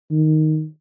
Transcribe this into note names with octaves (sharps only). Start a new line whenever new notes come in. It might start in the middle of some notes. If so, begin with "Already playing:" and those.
D#3